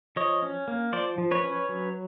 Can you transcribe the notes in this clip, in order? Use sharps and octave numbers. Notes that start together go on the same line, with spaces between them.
F3 C#5 D#5
C#4
A#3
F3 C5 D5
F3
B4 C#5
C#4
F#3